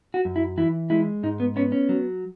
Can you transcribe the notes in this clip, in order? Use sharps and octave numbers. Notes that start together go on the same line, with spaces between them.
F#4
F#2
E4
E3 E4
G#3 E4
G#2 D#4
B3
B3 C#4
C#4
F#3